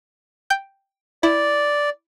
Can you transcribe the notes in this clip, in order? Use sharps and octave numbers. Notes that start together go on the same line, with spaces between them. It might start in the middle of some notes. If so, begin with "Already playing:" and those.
G5 G6
E4 D5